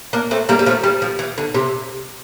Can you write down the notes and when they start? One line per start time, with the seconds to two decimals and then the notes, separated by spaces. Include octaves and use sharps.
0.13 A#3 D4
0.31 A3 C4
0.49 G3 A#3
0.59 G3
0.66 F3 A3
0.84 G3
1.02 F3
1.19 E3
1.38 D3
1.54 C3